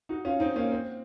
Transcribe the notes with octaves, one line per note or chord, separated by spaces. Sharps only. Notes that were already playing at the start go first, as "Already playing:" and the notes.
D#4 F#4
C#4 F4
C4 D#4
A#3 C#4
C4